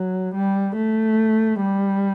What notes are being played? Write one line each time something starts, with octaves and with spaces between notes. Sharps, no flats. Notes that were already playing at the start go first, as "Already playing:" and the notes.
Already playing: F#3
G3
A3
G3